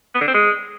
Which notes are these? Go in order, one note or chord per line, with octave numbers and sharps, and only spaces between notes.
B3
D3
C4
G#3